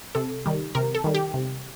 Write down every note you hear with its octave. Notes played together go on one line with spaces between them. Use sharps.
C3 A4
D#3 G3
C3 A#4
A4
D#3 G3
G4
C3